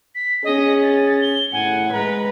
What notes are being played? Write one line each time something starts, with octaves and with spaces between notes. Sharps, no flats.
B6
C#4 G#4 D#5
A6
G7
A2 F#5 G#5
G#3 B4 A#5